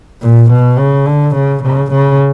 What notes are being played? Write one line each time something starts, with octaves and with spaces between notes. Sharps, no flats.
A#2
B2
C#3
D3
C#3
C#3
C#3